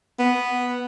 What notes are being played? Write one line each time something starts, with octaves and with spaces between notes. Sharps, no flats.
B3